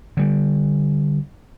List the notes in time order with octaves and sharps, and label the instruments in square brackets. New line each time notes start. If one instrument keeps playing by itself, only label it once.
[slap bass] D3 G3